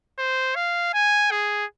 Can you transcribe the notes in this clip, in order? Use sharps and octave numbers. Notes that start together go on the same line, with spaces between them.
C5
F5
G#5
G#4